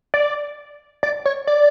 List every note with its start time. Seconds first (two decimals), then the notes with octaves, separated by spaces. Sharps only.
0.14 D5
1.03 D5
1.26 C#5
1.47 D5